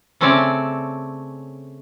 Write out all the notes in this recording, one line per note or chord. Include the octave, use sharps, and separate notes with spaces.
C#3 A3 C4 C#4 D5 A5